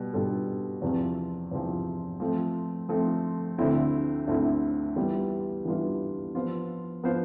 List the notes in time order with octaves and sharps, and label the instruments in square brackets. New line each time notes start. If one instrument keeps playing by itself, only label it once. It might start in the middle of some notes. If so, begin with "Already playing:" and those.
Already playing: [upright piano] B2 G3
B2 G3 D4 F4 A4
E2 C3 F3 C4
E2 C3 F3 C4
F3 A3 C4
F3 A3 C4
D2 D3 A3 C4 E4
D2 D3 A3 C4 E4
E3 G3 B3 D4 F4
E3 G3 B3 D4 F4
F3 B3 F4 C5
F3 B3 F4 C5